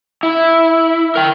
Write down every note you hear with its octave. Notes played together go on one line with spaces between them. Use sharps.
E4
A#4 G5